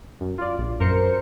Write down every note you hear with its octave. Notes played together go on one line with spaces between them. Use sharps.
F#2
F4 D5
A#1
F#2 A#4 C5 C#7